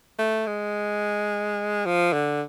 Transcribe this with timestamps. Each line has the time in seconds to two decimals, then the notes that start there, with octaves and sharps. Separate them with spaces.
0.19 A3
0.47 G#3
1.85 F3
2.13 D3